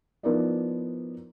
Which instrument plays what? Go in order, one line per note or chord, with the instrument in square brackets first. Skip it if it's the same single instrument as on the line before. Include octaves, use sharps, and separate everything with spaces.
[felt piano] F3 B3 D#4 E4 A#4 D5